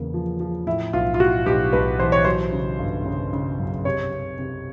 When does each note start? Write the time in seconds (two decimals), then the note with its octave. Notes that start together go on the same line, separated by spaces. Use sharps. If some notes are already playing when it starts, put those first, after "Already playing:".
Already playing: E2 C#3 A#3
0.14 F3
0.40 F3
0.67 A2 E4
0.93 B1 F4
1.14 F4
1.19 A2 F#4
1.46 B1 G4
1.73 B1 B4
1.99 E3 C5
2.12 C#5
2.25 F#3 C5
2.52 C#3
2.79 G1
3.05 C#3
3.33 C#3
3.59 F#2
3.85 C3 C#5
4.12 C3
4.39 C3